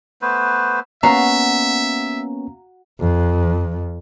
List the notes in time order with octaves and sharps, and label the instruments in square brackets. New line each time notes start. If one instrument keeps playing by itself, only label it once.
[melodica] A3 B3 B4 C5
[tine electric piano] A#3 B3 C#4 [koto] F#4 F5 [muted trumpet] E5 [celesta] A#5
[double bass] F2